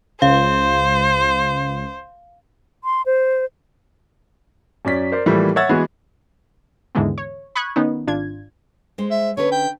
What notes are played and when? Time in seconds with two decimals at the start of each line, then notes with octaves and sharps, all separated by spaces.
0.22 C#2 C5 F5
2.84 C6
3.06 C5
4.85 F#2 C#4 D5 B6
5.12 A#4 C5 D5
5.26 A2 E3 F3 G3 A3 A#3
5.56 C#5 E5 F#5 E6 G#6 A6
5.69 E3 G#3 B3 F#4 G#4
6.95 D#2 G#2 D3 E3 G#3 B3
7.18 C#5
7.55 B5 C#6 D#6 F#6 G#6
7.76 D#3 B3 C#4 D#4
8.07 G#1 D4 F4 G#6
8.98 G#3 C5
9.11 E5
9.37 D3 C#4 B4 C#5
9.52 G5